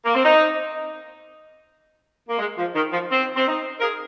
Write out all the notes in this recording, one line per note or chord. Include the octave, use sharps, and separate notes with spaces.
A#3
C4
D#4
A#3
G#3
F3
D#3
F3
C4
C4
D#4
A#4
G#4